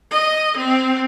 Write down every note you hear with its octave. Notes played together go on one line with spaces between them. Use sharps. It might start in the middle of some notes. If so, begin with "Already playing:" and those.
D#5
C4